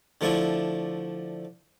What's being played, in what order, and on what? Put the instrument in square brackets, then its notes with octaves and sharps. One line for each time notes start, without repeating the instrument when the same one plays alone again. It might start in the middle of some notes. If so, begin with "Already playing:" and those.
[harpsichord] D3 F3 A3 D4 E4